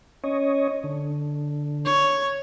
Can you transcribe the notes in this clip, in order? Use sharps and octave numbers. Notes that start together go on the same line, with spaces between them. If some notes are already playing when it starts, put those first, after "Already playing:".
C#4 C#5 D#5
D3
C#5